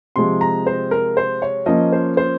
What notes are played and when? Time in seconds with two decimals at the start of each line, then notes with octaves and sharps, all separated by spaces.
0.16 C3 F3 G#3 C6
0.41 A#5
0.66 C5
0.91 A#4
1.17 C5
1.42 C#5
1.66 F3 A#3 C#4 D#5
1.92 C5
2.17 C5